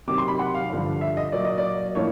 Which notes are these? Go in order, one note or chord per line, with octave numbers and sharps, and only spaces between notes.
C3 D#3 F#3 D6
C6
B5
F#5
F5
G2 D3 F3
E5
D#5
A#2 F#3 A#3 D5
D#5
D5
A2 F3 A#3 D4 C#5